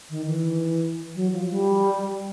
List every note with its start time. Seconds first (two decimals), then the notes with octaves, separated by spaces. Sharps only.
0.10 D#3
0.27 E3
1.15 F#3
1.32 F3
1.50 G3